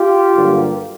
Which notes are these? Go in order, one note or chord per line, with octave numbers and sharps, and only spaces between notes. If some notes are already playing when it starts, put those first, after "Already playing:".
Already playing: F4 G4
G2 D3 F#3 A#3